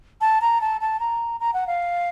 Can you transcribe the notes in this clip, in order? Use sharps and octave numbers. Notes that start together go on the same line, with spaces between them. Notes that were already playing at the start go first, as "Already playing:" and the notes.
A5
A#5
A5
A5
A#5
A#5
F#5
F5